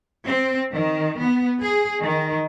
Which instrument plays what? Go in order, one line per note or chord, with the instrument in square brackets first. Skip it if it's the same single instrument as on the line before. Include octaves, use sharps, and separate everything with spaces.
[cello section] C4
D#3
B3
G#4
D#3